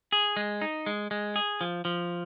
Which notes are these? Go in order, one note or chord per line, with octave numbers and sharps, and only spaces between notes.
G#4
G#3
D#4
G#3
G#3
G#4
F3
F3